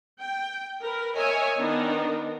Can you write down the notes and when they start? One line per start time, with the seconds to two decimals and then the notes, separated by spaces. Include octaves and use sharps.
0.20 G5
0.82 A#4 B4
1.13 A#4 C#5 D#5 E5 G#5
1.58 D#3 B3 D4 D#4